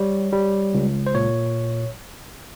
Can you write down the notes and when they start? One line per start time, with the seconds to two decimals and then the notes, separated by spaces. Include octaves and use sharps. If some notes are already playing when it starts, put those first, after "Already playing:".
Already playing: G3 C#5
0.32 G3
0.74 C#2
1.07 C5
1.14 A#2 C#5